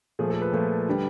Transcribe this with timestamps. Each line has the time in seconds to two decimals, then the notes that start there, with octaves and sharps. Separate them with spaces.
0.19 A#2 F3 A3 G#4
0.30 A4
0.42 B4
0.53 A#2 F3 A3
0.89 D3 G3